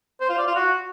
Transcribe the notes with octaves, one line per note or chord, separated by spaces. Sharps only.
C5
F4
D5
F4
F#4